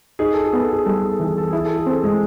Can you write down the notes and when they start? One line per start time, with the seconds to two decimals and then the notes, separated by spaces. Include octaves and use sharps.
0.19 D#4 G#4
0.33 A4
0.46 G#4
0.53 B3
0.59 A4
0.73 G#4
0.85 G3 A4
0.99 G#4
1.12 A4
1.20 E3
1.25 G#4
1.38 A4
1.50 E4 G#4
1.65 A4
1.78 G#4
1.87 C4 A4
2.03 G#3 G#4